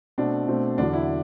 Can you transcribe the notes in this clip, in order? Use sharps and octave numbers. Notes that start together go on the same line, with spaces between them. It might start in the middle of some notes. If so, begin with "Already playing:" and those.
B2 A3 C4 D4
B2 A3 C4
E2 D3 F#3 D4
E4